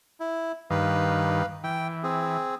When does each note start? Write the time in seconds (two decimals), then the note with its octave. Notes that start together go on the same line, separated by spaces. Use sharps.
0.20 E4
0.70 G2 D#3 B4 F5
1.64 E3 G5
2.03 C4 G#4